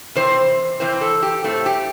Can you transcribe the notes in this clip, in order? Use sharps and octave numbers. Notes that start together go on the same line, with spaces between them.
C3 E3 C4 C5
C3 E3 C4 C5
A4
G4
A2 A3 C4 A4
G4